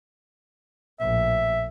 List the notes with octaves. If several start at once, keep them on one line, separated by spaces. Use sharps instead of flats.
A#1 A2 E5